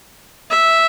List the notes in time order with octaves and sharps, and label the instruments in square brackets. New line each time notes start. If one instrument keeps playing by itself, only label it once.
[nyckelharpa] E5